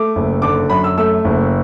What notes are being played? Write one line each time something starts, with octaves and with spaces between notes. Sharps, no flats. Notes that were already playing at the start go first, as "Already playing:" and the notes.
Already playing: A3 D6
F#1
D3 D6
F#2 B5
E6
A3 E6
F#1